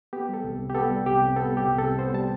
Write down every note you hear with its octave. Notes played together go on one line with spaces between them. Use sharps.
B3 G4
G3 A4
C2
C3
G4
B3 A4
G3
C2 G4
C3
B3 A4
G3 G4
C2
C3 A4
B3 C5
G3 A5